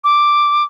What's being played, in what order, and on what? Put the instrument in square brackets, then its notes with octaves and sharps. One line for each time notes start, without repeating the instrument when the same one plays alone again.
[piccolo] D6